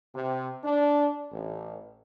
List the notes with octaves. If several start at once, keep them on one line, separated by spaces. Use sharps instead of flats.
C3
D4
A1